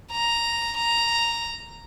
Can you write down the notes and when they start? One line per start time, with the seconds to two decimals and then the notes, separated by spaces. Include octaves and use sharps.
0.12 A#5
0.77 A#5